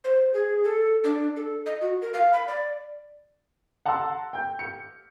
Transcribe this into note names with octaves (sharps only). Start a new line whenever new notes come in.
C5
G#4
A4
D4
A4
D#5
F#4
A#4
F5
B5
D5
F#5 A5 A#5 C6 E6
G5 G6
C#7